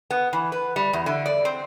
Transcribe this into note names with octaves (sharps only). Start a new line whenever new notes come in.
B3
E3
B4
G3
E2
D3
D5
C4